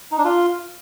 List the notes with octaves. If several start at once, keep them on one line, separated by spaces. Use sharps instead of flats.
D#4
D4
F4